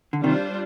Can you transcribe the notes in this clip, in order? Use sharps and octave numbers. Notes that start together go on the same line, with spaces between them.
D3
C3 D#3 G3 D4 F4 C5